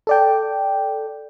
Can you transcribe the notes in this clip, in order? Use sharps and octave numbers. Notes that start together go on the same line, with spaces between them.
A4 D5 G5